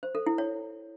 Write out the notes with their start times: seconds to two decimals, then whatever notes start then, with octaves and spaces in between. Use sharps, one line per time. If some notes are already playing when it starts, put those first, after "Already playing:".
0.03 C5
0.15 A4
0.26 E4
0.38 C#5